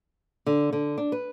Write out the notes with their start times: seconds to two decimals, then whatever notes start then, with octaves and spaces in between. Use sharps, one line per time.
0.46 D3
0.73 D3
0.98 D4
1.12 B4